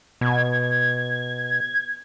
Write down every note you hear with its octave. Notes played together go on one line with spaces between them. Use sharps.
B2 G#6